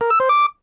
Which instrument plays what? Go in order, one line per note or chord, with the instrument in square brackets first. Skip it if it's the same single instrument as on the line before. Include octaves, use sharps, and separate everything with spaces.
[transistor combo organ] A#4
E6
C5
D6